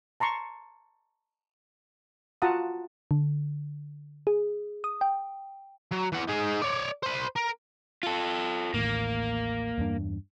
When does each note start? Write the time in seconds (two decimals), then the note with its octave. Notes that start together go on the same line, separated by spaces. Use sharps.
0.20 A5 A#5 C6 C#6
2.42 F4 F#4 F#5 A5 A#5 D#6
3.11 D3
4.27 G#4
4.84 D#6
5.01 G5
5.91 F#3
6.12 E3 F#5
6.29 D#4 G#4
6.62 C#5 D5
7.03 C5 B5
7.36 A#4
8.03 F4 A4
8.74 A1 D#2 A2 A#3
9.78 E2 G2 D4